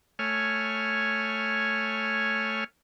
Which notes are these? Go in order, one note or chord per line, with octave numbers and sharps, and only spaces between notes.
A3 C#5 G#5 F6